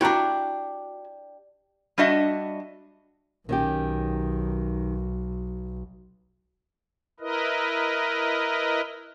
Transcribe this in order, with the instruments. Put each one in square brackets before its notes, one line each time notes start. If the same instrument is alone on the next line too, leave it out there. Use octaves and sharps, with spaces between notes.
[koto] D4 G4 [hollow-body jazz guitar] E4 F#4 A#5
[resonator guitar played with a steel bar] G3 D4 F#4 D#5 E5
[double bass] B1 [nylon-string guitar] D#3 C#4 G4
[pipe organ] E4 A#4 B4 D#5